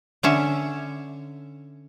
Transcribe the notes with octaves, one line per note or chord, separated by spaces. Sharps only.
D3 C#4 E5